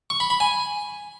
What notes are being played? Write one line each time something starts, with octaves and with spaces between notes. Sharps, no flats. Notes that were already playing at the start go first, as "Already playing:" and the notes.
C#6
B5
B5
G#5